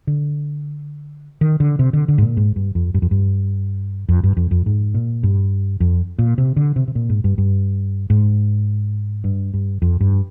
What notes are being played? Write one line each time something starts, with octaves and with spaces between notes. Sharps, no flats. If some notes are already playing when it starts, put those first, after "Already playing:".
D3
D#3
D3
C3
D3
D3
G#2
A#2
G#2
G2
F2
G2
F2
G2
F2
G2
F2
F2
G#2
A#2
G2
F2
A#2
C3
D3
C3
C3
A#2
G#2
G2
G2
G#2
G2
G2
F2
G2